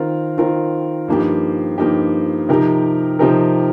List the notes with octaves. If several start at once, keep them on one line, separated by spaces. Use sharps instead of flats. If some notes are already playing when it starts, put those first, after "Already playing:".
Already playing: D#3 C4 F4 A#4
D#3 C4 F4 A#4
G2 F3 A#3 D#4 G4
G2 F3 A#3 D#4 G4
C3 F3 D#4 G4 A#4
C3 F3 D#4 G4 A#4